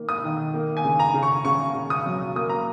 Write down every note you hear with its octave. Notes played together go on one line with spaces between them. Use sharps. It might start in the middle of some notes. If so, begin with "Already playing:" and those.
Already playing: D#3 A#3
D#6
D#3
A#3
G#5
C#3
A#5
C#3
C#6
C#3 C#6
C#3
D#6
F#3
A#3 D#6
A#5